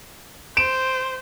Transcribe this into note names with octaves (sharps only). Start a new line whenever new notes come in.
C5 D7 E7